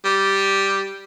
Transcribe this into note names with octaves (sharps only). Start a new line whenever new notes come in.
G3